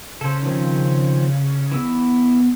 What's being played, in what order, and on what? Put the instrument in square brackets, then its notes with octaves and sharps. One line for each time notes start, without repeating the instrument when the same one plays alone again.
[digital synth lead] C#3 [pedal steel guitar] A4 C5
[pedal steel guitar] D#3 F3 C4
[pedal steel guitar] E3 E4 E6 [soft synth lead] B3